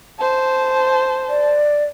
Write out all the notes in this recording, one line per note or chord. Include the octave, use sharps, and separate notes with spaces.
C5 A5
D5